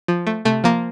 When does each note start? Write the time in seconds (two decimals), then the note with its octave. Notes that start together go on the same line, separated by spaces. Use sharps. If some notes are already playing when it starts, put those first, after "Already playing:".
0.08 F3
0.27 A3
0.45 C3 A3
0.64 F3 A#3